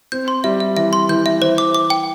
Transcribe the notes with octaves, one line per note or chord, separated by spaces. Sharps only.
C4 G6
C6
G3 E5
E5
E3 E5
C6
E3 G6
E5
E3 C5
D6
D6
G5